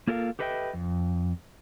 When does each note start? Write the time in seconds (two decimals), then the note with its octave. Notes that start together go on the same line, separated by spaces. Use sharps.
0.07 A#3 F4 A4 A#4 D#5 F5
0.39 G4 A4 B4 D#5 E5 G5
0.73 F2